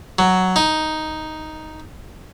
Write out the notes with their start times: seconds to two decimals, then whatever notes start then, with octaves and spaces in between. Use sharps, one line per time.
0.19 F#3
0.56 D#4